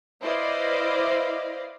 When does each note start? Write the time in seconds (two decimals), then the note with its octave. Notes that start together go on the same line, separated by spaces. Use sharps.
0.21 E4 B4 C5 D5 D#5 F5